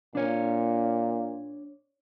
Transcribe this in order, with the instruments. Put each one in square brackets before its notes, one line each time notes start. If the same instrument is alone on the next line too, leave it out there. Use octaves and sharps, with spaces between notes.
[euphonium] A#2 [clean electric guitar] D4 C#5